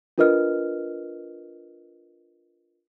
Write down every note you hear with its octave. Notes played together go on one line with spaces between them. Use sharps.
D4 F4 A#4 B4 D#5 F6